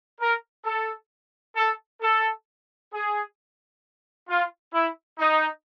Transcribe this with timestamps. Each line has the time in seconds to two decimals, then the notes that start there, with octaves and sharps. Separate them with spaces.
0.19 A#4
0.64 A4
1.55 A4
2.00 A4
2.92 G#4
4.28 F4
4.73 E4
5.18 D#4